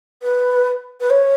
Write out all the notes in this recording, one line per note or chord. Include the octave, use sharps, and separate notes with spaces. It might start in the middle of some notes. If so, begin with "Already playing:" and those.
B4
B4
C#5